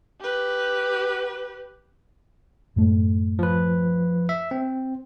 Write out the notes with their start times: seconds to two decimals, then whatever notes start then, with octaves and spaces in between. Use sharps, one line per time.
0.20 G4 B4
2.76 F#2 A2 A3
3.39 F3 B4
4.29 E5
4.51 C4